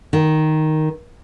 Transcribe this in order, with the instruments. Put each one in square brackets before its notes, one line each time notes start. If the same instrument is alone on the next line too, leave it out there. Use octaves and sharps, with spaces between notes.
[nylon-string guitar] D#3